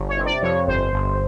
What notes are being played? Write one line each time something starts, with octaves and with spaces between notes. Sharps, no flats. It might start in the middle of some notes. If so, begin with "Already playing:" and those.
Already playing: G1
C#5
C3
D5
F2 C#5
G1 C5
G1